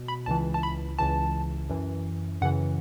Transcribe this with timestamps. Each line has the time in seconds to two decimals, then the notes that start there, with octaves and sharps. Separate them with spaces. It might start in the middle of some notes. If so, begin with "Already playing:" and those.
Already playing: B2
0.08 B5
0.26 C#2 C#3 E3 A5
0.54 A5
0.63 B5
0.99 C#2 C#3 E3 A5
1.69 F#2 E3
2.41 F#2 C#3 E3 F#5